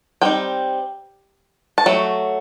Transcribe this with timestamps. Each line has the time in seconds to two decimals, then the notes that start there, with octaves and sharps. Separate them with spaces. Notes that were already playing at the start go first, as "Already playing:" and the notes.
0.22 G3 C4 D#4 G5
1.78 A5
1.86 F#3 A3